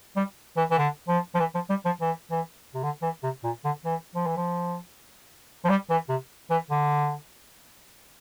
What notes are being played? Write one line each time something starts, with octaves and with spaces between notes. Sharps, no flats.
G3
E3
E3
D3
F3
F3
E3
F3
G3
F3
E3
E3
C3
D3
E3
C3
A#2
D3
E3
F3
E3
F3
F3
G3
E3
C3
E3
D3